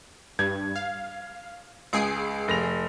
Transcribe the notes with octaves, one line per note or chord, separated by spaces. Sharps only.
G2 G#6
F5
C#2 G#4 C7 D7
F1 A#6 F7